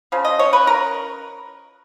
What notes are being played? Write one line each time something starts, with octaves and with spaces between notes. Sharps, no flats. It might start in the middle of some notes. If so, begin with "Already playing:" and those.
C#3 F3
D#5
C#5
B4
A#4